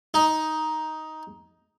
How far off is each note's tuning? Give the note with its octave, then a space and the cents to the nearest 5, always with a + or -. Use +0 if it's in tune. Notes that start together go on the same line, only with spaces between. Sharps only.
D#4 +10